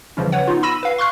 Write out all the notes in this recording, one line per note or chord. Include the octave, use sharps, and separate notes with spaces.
C#3 E3 F3 G3 C#4
B4 C#5 F#5
B3 D#4 F4
B5 E6 A#6 D#7 E7
B4 F5
C6 C#6 F6 F#6 C7